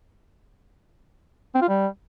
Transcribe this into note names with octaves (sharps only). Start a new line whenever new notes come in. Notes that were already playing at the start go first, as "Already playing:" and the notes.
C4
F4
G3